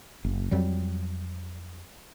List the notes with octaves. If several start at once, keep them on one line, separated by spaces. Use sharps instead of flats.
F#1
F2 F#3 G3